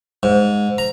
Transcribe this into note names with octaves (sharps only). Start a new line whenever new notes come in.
G#2
A#5